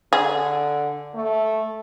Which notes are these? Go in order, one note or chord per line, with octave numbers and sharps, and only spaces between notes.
D3 G#4
A3